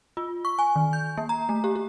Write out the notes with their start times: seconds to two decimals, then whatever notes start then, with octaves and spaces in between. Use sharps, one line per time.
0.17 F4
0.45 C#6
0.59 G#5
0.76 D#3
0.93 G6
1.18 A#3
1.29 A#5
1.49 A3
1.64 G4
1.76 G4